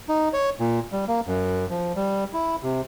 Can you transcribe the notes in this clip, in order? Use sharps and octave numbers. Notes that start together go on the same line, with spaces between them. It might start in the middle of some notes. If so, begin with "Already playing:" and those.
D#4
C#5
A#2
G3
A#3
F#2
F3
G3
E4
C3